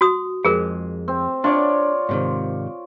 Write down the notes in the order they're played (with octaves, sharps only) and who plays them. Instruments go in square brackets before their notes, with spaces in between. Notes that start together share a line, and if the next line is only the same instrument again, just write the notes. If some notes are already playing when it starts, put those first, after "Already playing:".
[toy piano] F#4 C6 D#6
[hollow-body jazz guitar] F2 G#3 [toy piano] G#4 A#4
[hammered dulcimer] C4
[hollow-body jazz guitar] D4 [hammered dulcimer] F4 C#5 D5
[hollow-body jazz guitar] G#2 C3 D#3